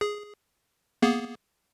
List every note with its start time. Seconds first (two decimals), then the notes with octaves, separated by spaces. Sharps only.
0.01 G#4
1.02 A#3 B3 G#4